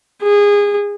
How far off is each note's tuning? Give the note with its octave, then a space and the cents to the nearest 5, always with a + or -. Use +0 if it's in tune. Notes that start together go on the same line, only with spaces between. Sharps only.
G#4 -25